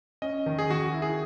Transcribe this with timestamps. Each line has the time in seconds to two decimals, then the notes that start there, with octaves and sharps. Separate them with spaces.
0.22 C#4 D#5
0.46 D#3
0.59 G#4
0.70 D#3 F#4
0.94 E4
1.02 G#4